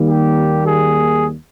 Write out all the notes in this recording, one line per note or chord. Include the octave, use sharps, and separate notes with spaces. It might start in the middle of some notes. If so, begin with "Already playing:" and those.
Already playing: D#2 D#3 G3 A#3
G4
G#4